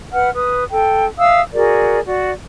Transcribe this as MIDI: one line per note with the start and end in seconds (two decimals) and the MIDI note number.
0.13 0.30 71
0.13 0.30 78
0.13 0.30 89
0.34 0.64 71
0.34 0.64 87
0.70 1.06 69
0.70 1.06 79
1.19 1.40 76
1.19 1.40 77
1.19 1.40 87
1.19 1.40 88
1.53 1.99 66
1.53 1.99 68
1.53 1.99 70
1.53 1.99 74
2.06 2.31 66
2.06 2.31 74